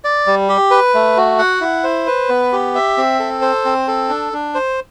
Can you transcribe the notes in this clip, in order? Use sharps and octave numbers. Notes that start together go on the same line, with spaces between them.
D5
G3
G4
B4
A3
F#4
F#5
E4
C5
B4
B3
G4
E5
C4
A4
C5
C4
A4
D4
D4
C5